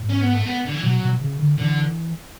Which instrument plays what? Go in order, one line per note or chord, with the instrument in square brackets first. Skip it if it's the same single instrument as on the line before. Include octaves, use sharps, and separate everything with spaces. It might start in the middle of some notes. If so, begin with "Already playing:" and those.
Already playing: [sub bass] G#2
[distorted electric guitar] C#4
B3
A3
B3
D3
E3
[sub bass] B2 [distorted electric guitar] F#3
[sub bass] B2
C#3
D3
[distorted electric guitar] D3 [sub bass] E3